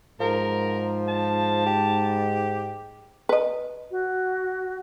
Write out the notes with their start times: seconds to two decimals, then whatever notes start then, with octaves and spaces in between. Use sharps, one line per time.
0.20 G#2 F3 A#4
1.08 A5
1.66 G4
3.29 B4 D#5
3.91 F#4